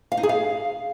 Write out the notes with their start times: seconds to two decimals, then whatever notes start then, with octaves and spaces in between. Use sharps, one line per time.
0.12 F5
0.17 D#4
0.23 G#4
0.29 F5